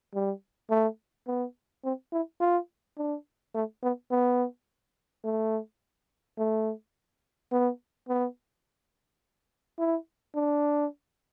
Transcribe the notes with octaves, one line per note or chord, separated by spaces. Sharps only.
G3
A3
B3
C4
E4
F4
D4
A3
B3
B3
A3
A3
B3
B3
E4
D4